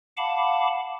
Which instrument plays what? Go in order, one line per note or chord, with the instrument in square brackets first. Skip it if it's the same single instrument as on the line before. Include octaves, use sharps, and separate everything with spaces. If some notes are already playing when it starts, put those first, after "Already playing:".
[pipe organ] F5 F#5 A5 B5 D6